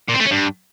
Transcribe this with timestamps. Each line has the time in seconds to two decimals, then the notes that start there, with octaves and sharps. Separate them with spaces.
0.09 A#2
0.15 C4
0.20 A3
0.26 C#4
0.31 G2